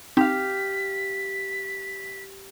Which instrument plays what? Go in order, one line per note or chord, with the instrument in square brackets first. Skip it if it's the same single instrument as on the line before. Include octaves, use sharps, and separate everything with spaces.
[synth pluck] C4 D#4 [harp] G4 F5 [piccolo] B6